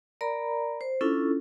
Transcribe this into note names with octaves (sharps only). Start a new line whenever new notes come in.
A#4 D5 A#5 B5
C5
C#4 D4 E4 F4 A4